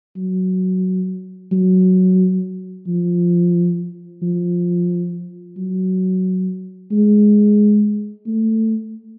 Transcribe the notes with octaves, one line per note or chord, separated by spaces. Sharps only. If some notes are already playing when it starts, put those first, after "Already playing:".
F#3
F#3
F3
F3
F#3
G#3
A3